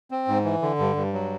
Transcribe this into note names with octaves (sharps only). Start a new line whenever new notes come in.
C4
G#2
E3
D3
G2
G2
F#3